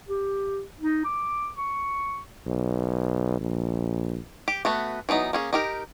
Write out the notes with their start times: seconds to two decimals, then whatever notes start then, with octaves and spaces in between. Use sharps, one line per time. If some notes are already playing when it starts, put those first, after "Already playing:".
0.08 G4
0.80 D#4
1.05 D6
1.56 C#6
2.46 B1
3.40 A#1
4.48 G4
4.65 A3 B3 F#4
5.09 E3 F#3 B3 D#4
5.33 A#3 C#4 G#4
5.53 D#4 G4 A#4